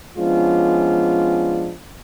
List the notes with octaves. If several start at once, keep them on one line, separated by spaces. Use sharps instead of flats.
F3 G#3 B3 C#4 D4 F4